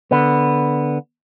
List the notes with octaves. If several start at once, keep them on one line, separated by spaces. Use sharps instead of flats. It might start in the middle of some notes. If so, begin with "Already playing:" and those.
D3 B3